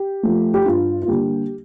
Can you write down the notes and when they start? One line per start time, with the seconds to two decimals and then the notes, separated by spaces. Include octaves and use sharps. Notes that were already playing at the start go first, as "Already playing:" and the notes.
Already playing: G4
0.23 F3 A3
0.54 G4
0.65 G2 F4
1.02 F4
1.07 D3 G3 A#3 G4